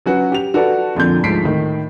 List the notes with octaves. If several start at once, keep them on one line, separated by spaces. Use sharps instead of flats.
F#3 C#4 F#4 B4
G4 F7
F#4 A4 B4 D5 A5
F1 F2 A#2 D3 G6
D2 G#2 F3 B6 C7 D7
A2 D#3